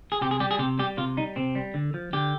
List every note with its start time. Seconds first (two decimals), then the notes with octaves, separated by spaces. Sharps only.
0.12 G#4
0.21 C3 G4
0.31 G#4
0.40 G3 G4
0.51 G#4
0.59 C3 G4
0.79 G3 G4
0.97 C3 F4
1.17 G3 D#4
1.36 C3 C4
1.55 G3
1.74 D3
1.94 F3
2.13 D3 G4